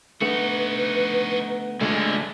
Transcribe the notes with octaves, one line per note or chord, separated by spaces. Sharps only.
D3 A3 B3 D#4 F#4 B4
D3 G#3 A3 D5 F5